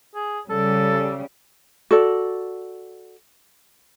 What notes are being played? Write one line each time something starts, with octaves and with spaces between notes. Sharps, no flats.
G#4
C#3 G3 A4
F#4 A4 D5